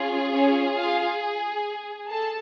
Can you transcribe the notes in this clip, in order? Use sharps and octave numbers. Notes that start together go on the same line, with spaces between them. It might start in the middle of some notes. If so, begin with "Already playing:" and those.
Already playing: C#4 F4 G#4
C#4 C#5
F4 F5
A4 A5